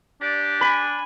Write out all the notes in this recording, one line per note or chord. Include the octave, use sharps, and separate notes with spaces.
D4 G4 D5
G#5 B5